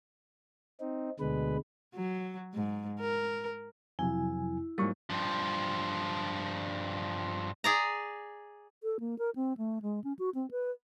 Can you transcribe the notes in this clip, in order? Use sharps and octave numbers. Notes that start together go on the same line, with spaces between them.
C4 D#4
D2 B2 D3 G#3 B4
F#3
G#2
A#4
F2 C3 F#3 E4 G#5
G#2 F#3 G3 A#3 C#6
G2 F3
G#4 D5 A#5
A4
A#3
A#4
C4
A3
G#3
C#4
F#4
C4
B4